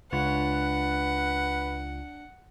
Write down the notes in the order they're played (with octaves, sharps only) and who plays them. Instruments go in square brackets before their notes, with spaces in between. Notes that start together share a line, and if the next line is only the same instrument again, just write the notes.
[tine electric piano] C#2 F4 [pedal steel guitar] D4 C#5 [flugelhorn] B4 [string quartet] F#5